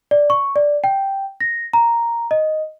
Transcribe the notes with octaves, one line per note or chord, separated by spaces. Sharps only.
D5
C#6
D5
G5
A#6
A#5
D#5